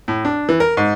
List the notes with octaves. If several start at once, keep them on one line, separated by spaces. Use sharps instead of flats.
A2
D4
E3
A#4
G#2